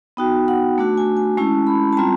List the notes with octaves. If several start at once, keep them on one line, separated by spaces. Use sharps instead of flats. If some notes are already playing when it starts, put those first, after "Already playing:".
B3 D#4 F#4 G5
F#5
A3 D4 F#4
G#5
G#5
G#3 C#4 E4 A5
B5
A5
G3 C4 F4 A#5